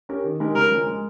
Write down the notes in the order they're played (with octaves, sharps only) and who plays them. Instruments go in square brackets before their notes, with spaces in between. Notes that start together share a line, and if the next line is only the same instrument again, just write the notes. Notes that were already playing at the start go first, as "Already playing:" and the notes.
[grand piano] C#4 G4 A#4
D#3
G#3 D#4 G4 A#4
[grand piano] C#3 [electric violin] A#4
[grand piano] F3 G#3 C#4
G#3